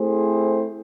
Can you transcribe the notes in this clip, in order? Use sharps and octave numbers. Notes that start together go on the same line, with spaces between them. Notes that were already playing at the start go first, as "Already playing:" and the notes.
Already playing: A3 C4 E4 G#4 C5